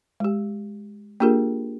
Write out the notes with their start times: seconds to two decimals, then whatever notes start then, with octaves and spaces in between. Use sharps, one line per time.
0.20 G#3 G4
1.20 A#3 D4 F4 G4 G#4 A#4